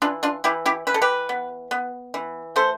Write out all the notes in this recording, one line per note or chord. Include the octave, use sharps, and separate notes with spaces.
E3 D4 F4
D4 F4
E3 E4 G4
E4 G4
E3 B4
A4
G4 B4
B3
B3
E3
A3 A4 C5